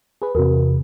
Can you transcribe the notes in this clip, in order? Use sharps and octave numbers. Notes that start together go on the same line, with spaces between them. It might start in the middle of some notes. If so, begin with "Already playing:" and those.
G#4 B4
E2 C3 F#4 A#4